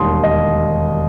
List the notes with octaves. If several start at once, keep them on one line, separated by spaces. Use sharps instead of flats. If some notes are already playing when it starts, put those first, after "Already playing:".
Already playing: E1 D#2 D#3 G3 C6 D#6
D#5